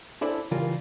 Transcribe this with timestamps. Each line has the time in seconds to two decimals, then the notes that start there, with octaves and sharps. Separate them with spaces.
0.21 C#4 D4 E4 A4 C5 D5
0.51 C#3 E3 G3 F4 A#4